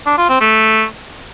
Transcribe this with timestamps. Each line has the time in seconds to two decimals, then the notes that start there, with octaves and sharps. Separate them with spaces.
0.07 D4
0.18 F4
0.29 C4
0.41 A3